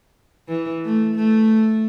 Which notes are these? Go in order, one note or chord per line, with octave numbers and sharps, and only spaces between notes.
E3
A3
A3